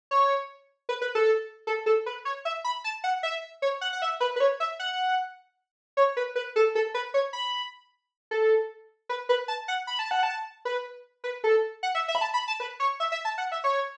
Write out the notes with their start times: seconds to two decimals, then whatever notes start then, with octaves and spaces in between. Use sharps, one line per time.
0.11 C#5
0.89 B4
1.02 B4
1.15 A4
1.67 A4
1.86 A4
2.06 B4
2.25 C#5
2.45 E5
2.64 B5
2.84 A5
3.04 F#5
3.23 E5
3.62 C#5
3.81 F#5
3.93 F#5
4.02 E5
4.20 B4
4.36 B4
4.40 C#5
4.60 E5
4.80 F#5
5.97 C#5
6.17 B4
6.35 B4
6.56 A4
6.75 A4
6.94 B4
7.14 C#5
7.33 B5
8.31 A4
9.09 B4
9.29 B4
9.48 A5
9.68 F#5
9.87 B5
9.99 A5
10.11 F#5
10.23 A5
10.65 B4
11.24 B4
11.44 A4
11.83 F#5
11.95 E5
12.08 E5
12.15 B5
12.21 A5
12.34 B5
12.48 A5
12.60 B4
12.80 C#5
13.00 E5
13.12 E5
13.25 A5
13.38 F#5
13.52 E5
13.64 C#5